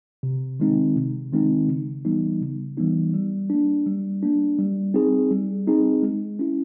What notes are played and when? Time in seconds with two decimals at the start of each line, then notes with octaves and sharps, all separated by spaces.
0.23 C3
0.60 D#3 G#3 C4 D#4
0.96 C3
1.32 D#3 G#3 C4 D#4
1.69 C#3
2.05 E3 G3 B3 D#4
2.42 C#3
2.77 E3 G3 B3 D#4
3.14 G3
3.50 A#3 D4
3.86 G3
4.23 A#3 D4
4.59 G3
4.94 C4 D#4 G#4
5.31 G3
5.67 C4 D#4 G#4
6.03 G#3
6.39 C#4 E4